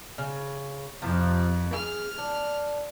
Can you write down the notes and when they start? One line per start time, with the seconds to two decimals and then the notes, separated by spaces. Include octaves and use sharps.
0.18 C#3
1.02 F2 C3 F3
1.74 G#4 F6
2.18 D4